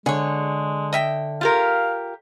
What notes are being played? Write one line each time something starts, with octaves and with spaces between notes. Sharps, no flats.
D3 G#3 G#4 C#5
D#5 E5 G5
F4 G4 A#4 F5